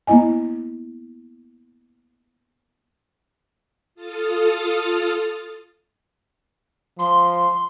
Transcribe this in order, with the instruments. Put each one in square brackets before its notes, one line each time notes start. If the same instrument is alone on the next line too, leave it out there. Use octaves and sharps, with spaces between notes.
[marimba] A#3 B3 E4 D#5 G#5
[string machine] F4 A4 D#6 F6 A6
[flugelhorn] F3 [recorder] C6